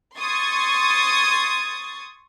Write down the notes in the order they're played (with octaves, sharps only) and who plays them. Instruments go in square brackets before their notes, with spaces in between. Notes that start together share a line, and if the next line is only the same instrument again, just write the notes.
[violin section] C6 C#6 D#6 G#6 A6